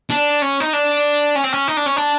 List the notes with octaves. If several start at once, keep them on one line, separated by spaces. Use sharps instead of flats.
D4
C#4
D#4
D4
C#4
C4
C#4
D#4
D4
C#4
D4